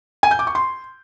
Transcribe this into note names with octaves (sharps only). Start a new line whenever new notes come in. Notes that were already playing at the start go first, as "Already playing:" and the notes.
G#5
G6
D6
C#6
C6